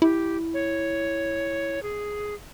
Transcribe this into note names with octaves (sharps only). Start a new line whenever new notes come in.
E4 G4
C#5
G#4